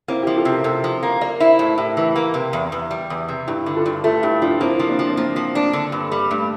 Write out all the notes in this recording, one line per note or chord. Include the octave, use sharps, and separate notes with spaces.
A#3 C4 E4
F3 E4 G4
F4 A4
C3
G4 A#4
C3 A4 C5
F3
A#3
A#3 A#4 D5
E4 C5 E5
A2 A4 C5
A2 G4 A#4
E3
A#3
C3
E2
E2
G3
E2
C3
G2 E4 G4
D3
F4 A4
G2
A3 F4 A4
G2 E4 G4
F3 D4 F4
A#3 C4 E4
F3
A#3 D4
F3
C4
F3 A#3
F3
D4
D3
G2
G3
G2 A3